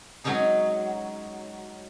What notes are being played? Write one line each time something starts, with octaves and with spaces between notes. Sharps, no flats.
F#3 G#3 C#4 D#4 G#4